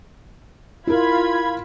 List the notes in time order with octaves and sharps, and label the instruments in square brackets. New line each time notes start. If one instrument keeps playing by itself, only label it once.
[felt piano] E4 A#4 [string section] F4 B5 G#6